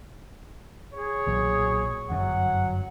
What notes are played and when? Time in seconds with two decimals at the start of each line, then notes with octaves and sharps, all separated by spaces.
0.94 G#4 C#5
1.27 B1 A#2 F#3
2.10 G1 F#2 F#3 F#5